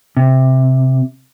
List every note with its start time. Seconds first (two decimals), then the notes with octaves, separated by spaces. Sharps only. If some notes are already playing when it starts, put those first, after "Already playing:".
0.17 C3